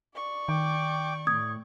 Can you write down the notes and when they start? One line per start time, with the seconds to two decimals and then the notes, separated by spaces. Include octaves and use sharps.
0.15 D5 C#6
0.49 D#3 G5 D6
1.27 A2 D#6 G#6